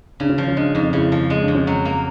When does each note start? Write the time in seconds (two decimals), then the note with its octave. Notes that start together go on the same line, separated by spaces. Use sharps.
0.20 C#3 D4
0.29 C#4
0.38 F3
0.48 C#4
0.57 G#3 D4
0.75 F2 D#4
0.93 C#3 E4
1.12 F3
1.30 G#3
1.42 D4
1.48 F2
1.55 C#4
1.67 F#3
1.85 A#3